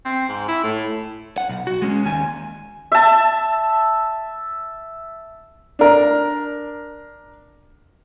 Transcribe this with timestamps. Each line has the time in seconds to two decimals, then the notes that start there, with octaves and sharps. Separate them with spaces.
0.05 C4
0.29 G#2
0.48 E4
0.64 A2
1.38 F#5
1.49 B1
1.67 F#4
1.82 G#3 C#4
2.05 D#2 G#5
2.92 E5 A5
5.79 D4 A#4